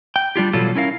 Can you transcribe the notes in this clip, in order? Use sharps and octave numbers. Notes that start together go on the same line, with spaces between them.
G5
G3 D4 F4 G4
B2 E3 F#3 G3 F4 A4
C#4 E4 A#4 F5